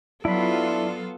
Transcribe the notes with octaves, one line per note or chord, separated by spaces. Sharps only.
F#3 B3 D4 E4 F4 A4 B5